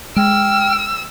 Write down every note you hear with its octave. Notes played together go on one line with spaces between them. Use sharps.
G#3 G5 E6 F6